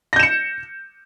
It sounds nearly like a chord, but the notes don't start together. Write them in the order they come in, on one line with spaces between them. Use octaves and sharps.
A#6 G6 E7 C#7